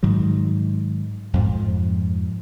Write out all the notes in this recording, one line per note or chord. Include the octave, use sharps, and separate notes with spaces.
G#2 D#3 F#3
F2 G#2 F3